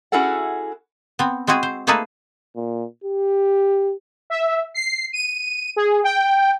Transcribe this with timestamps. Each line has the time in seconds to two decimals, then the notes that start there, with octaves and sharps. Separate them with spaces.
0.12 C#4 E4 F#4 G#4 A4 F#5
1.19 B3 C4
1.47 G#3 C4 E4 F#4 G#4
1.63 C5
1.87 A3 A#3 D#4 G#4 A4 B4
2.56 A#2
3.04 G4
4.30 E5
4.74 C7
5.13 D#7
5.76 G#4
6.04 G5